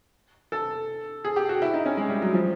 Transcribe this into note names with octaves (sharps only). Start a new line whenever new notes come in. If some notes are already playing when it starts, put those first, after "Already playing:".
A4
G#4
G4
F#4
E4
D#4
C#4
G#3
G3
F#3
F3